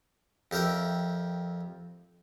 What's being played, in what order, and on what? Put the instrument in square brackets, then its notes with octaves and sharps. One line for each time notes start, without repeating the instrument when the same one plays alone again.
[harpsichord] F2 G4 A#4 E5 G5